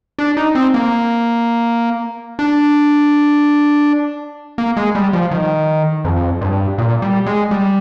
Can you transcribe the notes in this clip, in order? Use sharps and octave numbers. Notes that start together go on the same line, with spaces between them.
D4
D#4
C4
A#3
D4
A#3
G#3
G3
F3
D#3
F2
G2
A#2
G3
G#3
G3